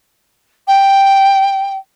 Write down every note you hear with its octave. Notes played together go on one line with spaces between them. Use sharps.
G5